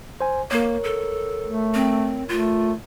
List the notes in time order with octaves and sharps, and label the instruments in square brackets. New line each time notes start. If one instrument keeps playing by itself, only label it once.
[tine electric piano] C5 G#5
[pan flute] A#3 [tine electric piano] A#4 C#5
[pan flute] A4
[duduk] A3
[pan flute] C4
[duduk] A3 [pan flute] F4